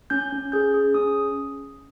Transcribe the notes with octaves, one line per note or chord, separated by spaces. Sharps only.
C#4 G6
C#4
G#4 G6
G#4
C#4 D#6